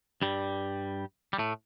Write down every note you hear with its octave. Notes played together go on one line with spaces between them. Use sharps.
G2 G3
G3
A2 A3